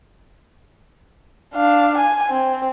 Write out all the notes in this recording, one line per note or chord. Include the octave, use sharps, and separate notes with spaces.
D4 F5
G#5
C4